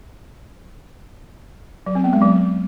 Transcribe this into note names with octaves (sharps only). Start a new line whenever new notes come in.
F#3
C4
B3
G#3
F#3